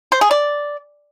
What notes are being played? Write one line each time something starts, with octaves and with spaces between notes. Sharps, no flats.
C5
G#4
D5